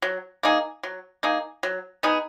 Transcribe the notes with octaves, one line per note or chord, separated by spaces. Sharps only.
F#3
A#3 D#4 G#4
F#3
A#3 D#4 G#4
F#3
B3 D#4 G#4